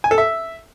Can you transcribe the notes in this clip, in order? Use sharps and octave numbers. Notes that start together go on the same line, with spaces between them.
G#5
A4
E5